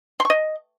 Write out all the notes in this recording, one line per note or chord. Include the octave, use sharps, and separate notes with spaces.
C6
C#6
D#5